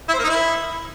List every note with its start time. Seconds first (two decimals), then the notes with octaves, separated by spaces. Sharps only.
0.08 E4
0.13 C5
0.19 A#3
0.24 D#4
0.29 E4